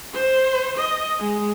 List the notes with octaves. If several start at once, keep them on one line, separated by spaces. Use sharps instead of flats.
C5
D#5
G#3